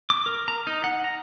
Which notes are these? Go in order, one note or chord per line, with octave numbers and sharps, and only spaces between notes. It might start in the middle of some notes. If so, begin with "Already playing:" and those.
D6
A#4
A#5
D#4
F#5
A#5